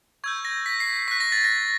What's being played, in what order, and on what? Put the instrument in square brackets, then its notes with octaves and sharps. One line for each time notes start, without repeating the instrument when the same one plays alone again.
[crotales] C#6 E6 G6 G#6
A#6
B6
C7
C#6 F#6 B6
A#6
A6
A#6